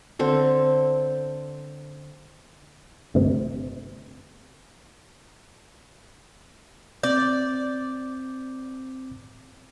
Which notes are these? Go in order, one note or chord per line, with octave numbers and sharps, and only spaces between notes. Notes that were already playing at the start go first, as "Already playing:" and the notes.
D3 C4 A4
G1 D2 C3
C4 D5 D6 G6